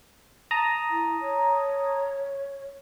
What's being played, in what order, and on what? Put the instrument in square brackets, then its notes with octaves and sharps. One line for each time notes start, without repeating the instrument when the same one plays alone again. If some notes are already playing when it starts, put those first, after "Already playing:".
[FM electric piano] A5 A#5 D#6
[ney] E4
C#5